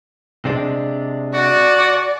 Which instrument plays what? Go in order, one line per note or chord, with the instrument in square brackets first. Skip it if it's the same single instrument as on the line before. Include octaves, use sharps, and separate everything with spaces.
[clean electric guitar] C3 G#3 D4
[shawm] F#4 [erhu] D5